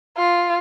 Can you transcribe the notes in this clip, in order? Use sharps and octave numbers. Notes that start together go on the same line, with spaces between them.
F4